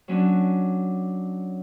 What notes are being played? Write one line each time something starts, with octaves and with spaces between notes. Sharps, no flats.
F#3 C#4 D4